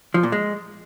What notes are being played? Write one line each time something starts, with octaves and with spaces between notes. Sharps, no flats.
F3
A#2
G#3